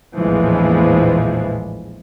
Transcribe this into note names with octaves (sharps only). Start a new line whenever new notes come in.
A#1 E2 A2 E3 F3 G#3